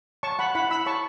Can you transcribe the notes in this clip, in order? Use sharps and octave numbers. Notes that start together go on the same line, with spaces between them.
C#5 A5 C#6
F#5 B5
E4 F#5 B5
B5 E6
C#5 A5 C#6